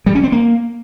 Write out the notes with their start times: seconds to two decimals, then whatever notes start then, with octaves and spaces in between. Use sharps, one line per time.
0.06 G3
0.15 C#4
0.24 C4
0.32 A#3